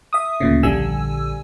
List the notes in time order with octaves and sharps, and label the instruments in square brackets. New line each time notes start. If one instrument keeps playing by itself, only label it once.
[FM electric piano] E5 D#6
D2 A#2 C#3
A#1 D3 G3 G#5 E6